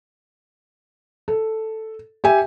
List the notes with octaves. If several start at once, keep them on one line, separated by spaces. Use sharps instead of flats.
A4
G4 E5 G#5